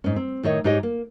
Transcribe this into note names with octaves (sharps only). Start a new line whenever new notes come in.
G#2 C#4
C4
A2 D#3 C#5 D#5
G#2 D#4 G4 C#5 D#5
A#3